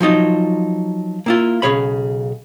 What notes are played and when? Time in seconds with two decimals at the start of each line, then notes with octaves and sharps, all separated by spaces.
0.01 F3 F#3 D#4 F4
1.26 A#3 E4 F4
1.62 B1 C#3 A3 G#4 C#5 B5